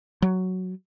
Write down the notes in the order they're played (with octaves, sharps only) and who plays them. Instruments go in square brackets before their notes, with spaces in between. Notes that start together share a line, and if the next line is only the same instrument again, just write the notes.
[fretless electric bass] F#3